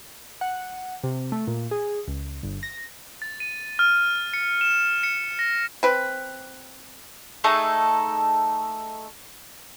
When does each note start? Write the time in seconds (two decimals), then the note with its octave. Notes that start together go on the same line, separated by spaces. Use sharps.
0.41 F#5
1.04 C3
1.32 A3
1.47 A#2
1.71 G#4
2.08 C#2
2.43 G1
2.63 A#6
3.22 A6
3.40 D#7
3.79 F6
4.33 C#7
4.61 E7
5.03 C#7
5.39 A#6
5.83 C4 B4
7.44 A3 D#4 G#4 A4